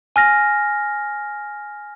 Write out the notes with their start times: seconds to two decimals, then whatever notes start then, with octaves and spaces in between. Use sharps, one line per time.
0.16 G#5 F6 A#6